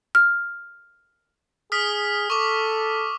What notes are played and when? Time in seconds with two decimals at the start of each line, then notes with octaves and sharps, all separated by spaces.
0.15 F6
1.72 G#4 D#6 F6 B6
2.30 A4 C#6 D6